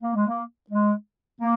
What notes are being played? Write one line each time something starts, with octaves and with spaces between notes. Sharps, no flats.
A#3
G#3
A#3
G#3
A#3